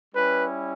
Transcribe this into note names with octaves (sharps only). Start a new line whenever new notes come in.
G3 C#4 E4 B4